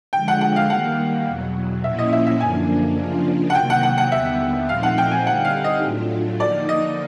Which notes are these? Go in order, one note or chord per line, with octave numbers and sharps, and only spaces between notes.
D3 F3 G#3 G5
F#5
F#5
F5
D#3 G3 A#3 F#5
E2 B2 F#3
A#2 F3 A#3 C#4 E4 E5
D#5
E5
E5
F#2 D3 F3 A#3 D4 G#5
C#3 F3 A#3 D4 F4
F#5
C3 D#3 F#3 A#3 G5
F#5
F#5
F#5
D#2 D3 G3 B3 E5
A#2 F3 A3 C4 D#4 F5
F#5
G5
G#5
D3 G3 C4 D#4 F#5
F5
D#5
A2 F#3 A3 D4 F4
D3 F3 A#3 D#4 D5
D#5